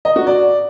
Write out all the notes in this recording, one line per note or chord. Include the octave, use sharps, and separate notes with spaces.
D#5
F#4
D5